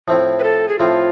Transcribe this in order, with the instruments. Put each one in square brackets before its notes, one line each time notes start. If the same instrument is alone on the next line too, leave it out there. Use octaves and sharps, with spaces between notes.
[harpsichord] A2 F3 A3 C4 E4
[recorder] B4
A4
G#4
[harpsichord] A2 F3 A3 C4 E4 [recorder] F4